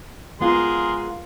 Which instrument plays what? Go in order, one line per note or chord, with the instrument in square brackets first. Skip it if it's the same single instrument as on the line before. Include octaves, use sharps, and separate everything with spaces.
[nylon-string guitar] G#3 B3 F4 [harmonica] G#4 A#4 C6